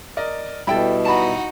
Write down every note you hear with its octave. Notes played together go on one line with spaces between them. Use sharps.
A#4 D5 D#5
B2 G3 E4 A4 E5 G5 B5
D#4 F#4 A5 B5